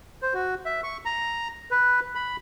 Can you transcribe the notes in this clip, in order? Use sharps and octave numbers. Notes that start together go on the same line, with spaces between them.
C5
F#4
E5
C#6
A#5
B4
B5